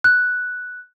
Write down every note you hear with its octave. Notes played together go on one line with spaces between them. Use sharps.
F#6